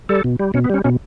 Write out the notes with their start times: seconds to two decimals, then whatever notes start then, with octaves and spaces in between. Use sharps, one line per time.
0.09 G3 A4
0.24 B2
0.39 G3
0.54 B2 C#4
0.64 B3
0.70 G3 C#4
0.84 B2 C#4